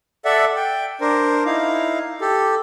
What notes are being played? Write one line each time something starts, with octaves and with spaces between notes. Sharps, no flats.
A4 D5 E5 F#5
G5
D4 A#4 C5
D#4 E4 F5
G4 A4